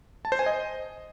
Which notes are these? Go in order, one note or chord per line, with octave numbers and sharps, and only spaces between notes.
A5
C5
G#5
D#5